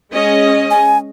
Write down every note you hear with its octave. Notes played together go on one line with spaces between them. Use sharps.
G#3 C#4 D#5
G#5